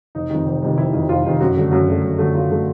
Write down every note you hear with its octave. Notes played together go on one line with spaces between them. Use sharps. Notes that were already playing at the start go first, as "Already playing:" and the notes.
F1 D#4
F2 C3 D#3
F1
F2 C3 D#3
F1 E4
F2 C3 D#3
F1 F4
F2 C3 D#3
F#2 F#4
D3 F#3 A3
F#2 F#4
D3 F#3 A3
F#2
D3 F#3 A3
F#2 F4
D3 F#3 A3